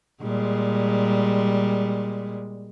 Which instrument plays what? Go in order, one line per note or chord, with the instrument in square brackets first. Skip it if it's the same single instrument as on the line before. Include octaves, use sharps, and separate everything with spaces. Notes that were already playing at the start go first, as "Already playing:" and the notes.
[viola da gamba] A#2 G3 G#3